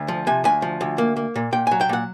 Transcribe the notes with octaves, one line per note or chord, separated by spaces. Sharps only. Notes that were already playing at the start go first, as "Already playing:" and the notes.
Already playing: D2
F3
C3 G#5
D2 G#5
F3
D2
A#3
A#3
A#2
A#2 G5
F#3 G#5
G5
A#2 F#5